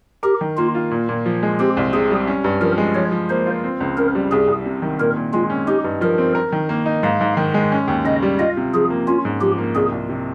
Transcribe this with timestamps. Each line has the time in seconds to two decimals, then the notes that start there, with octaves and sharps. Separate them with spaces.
0.23 G4 A#4
0.41 D#3
0.57 A#3 F4
0.75 F4
0.91 A#2
1.09 A#2
1.26 F3
1.43 G#3
1.59 C4 G4
1.77 C2
1.93 C3 G#4
2.11 G3
2.28 C#4
2.44 G2
2.61 F3 A#4
2.78 G#3
2.95 F3 C#5
3.12 F3
3.29 A#3 C5
3.46 F4
3.64 C4
3.80 C#2
3.97 C#3 A#4
4.15 G3
4.31 C2 G#4
4.48 C2
4.65 C3
4.82 D#3
4.99 A#2 A#4
5.16 A#2
5.33 G#3 F4
5.50 C#4
5.67 D#4 G4
5.84 G2
6.01 F3 A#4
6.18 C4
6.35 A#4
6.52 D#3
6.69 A#3
6.86 D#4
7.03 G#2 F5
7.21 G#2
7.37 D#3
7.54 G#3
7.72 C#4
7.88 D#2
8.05 C#3 D#5
8.22 G3
8.39 F4 D#5
8.57 C3
8.74 F3 G#4
8.90 A#3
9.07 C#4 F4
9.25 G#2
9.41 F3 G4
9.58 A#3
9.75 C2 G#4
9.92 C2
10.09 C3